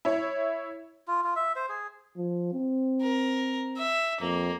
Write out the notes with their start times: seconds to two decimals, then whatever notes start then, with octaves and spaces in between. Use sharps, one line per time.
0.05 E4 C#5
1.08 F4
1.24 F4
1.36 E5
1.56 C5
1.69 G#4
2.17 F3
2.53 C4
3.02 A#4
3.78 E5
4.21 F2 A#3